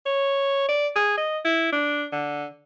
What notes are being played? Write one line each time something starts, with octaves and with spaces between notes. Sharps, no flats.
C#5
D5
G#4
D#5
E4
D4
D3